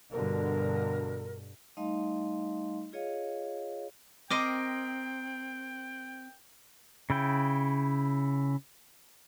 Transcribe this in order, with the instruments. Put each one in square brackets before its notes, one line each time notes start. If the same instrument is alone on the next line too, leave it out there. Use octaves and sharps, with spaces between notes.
[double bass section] G2 B2 D3 [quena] A#4
[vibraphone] G3 A3 D#4 D#5 F5 C6
F4 G#4 C#5 D#5 F5
[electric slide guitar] C4 [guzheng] A#4 D#5 C6 [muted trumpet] G5 [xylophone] D6
[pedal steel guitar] C#3 E4 G5